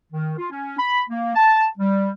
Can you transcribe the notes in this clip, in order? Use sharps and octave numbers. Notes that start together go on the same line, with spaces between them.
D#3
F4
C#4
B5
A#3
A5
G3